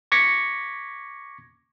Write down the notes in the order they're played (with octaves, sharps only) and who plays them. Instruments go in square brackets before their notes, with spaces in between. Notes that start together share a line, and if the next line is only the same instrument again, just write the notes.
[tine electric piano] C#6 D6 G#6 A#6 B6 C#7